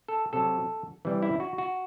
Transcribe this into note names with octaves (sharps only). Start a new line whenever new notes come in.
A4
C3 F#3 A4
C3 E3 G3
E4
F#4
F#4